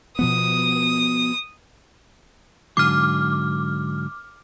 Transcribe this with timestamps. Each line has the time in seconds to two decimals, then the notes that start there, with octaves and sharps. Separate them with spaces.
0.19 B2 F3 B3 D#6
2.77 G#2 D3 F#3 D6 F6